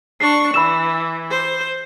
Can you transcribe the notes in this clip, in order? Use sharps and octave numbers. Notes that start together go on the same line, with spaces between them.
D4 C#6 C7
E3 B5 E6 E7
C5